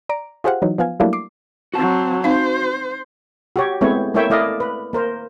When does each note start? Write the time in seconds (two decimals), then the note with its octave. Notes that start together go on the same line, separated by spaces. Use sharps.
0.09 D5 A#5 D7
0.44 F4 G4 G#4 C5 F5 F#5
0.62 E3 F#3 D#4
0.78 F3 B3 F5 G#5
1.00 F#3 G3 A3 A#3 D4 E4
1.13 D6 C7
1.74 F#3 C4 F#4 A5
2.24 C4 D#4 C5 F5
3.56 F#4 G4 C#5
3.81 G#3 A3 B3 C4 E4 C#5
4.14 A3 A#3 E4 C#5 E5 G5
4.30 A3 E4 D5 D#5 F5
4.60 B4
4.93 A#3 A#4 C5